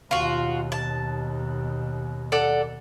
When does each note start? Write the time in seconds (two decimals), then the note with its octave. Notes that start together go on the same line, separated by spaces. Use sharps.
0.11 D#2 B2 F4 F#4
0.72 A5
2.32 A4 D5 F#5